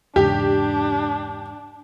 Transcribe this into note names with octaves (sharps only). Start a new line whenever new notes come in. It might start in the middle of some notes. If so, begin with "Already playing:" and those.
E2 G#2 C#3 D4 G4